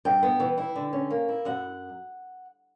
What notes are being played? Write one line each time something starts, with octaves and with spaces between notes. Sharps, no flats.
G2 G5
B3
E3
E4
D3
C#4
A#3
E4
F#2 F#5